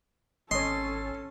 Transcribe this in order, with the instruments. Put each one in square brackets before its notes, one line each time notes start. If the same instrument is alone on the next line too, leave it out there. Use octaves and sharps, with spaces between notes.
[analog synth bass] G#1 [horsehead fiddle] C#4 A4 [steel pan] C#5 D#5 [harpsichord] C6